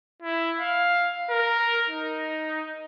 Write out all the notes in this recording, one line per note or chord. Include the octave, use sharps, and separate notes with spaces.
E4
F5
A#4
D#4